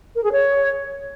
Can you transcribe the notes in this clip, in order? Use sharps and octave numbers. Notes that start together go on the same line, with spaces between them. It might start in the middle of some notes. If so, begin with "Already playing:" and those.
A#4
G#4
C#5